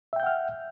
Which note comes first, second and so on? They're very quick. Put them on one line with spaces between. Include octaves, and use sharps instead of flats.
E5 G5 G6 F#5 F6